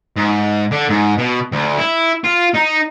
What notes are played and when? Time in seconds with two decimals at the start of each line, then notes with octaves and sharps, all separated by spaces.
0.17 G#2
0.72 D3
0.90 G#2
1.18 B2
1.52 D2
1.79 E4
2.24 F4
2.54 D#4